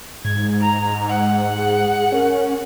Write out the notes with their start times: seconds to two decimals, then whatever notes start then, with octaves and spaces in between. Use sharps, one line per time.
0.25 G#2 G#6
0.60 A#5
1.09 F#5
1.56 G#4
2.12 C#4 A#4